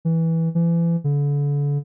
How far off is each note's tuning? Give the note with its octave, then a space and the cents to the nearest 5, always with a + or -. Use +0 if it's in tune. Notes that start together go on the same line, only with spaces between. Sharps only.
E3 -10
E3 +35
D3 -35